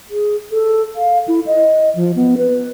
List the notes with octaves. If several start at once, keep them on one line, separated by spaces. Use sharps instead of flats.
G#4
A4
F5
E4
D#5
F3
B3
B4